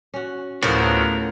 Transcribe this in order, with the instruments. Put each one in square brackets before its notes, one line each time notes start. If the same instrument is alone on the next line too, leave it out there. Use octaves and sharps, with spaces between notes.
[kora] C#4 F#4
[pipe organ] D2 [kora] A2 C#3 F3 [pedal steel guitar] B3 F#4 [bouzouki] A#4 C5